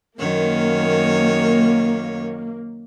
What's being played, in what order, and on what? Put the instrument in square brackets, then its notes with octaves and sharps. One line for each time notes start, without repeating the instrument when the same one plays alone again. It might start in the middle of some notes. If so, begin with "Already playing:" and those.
[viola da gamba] F#2 D#3 C#5 [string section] A#3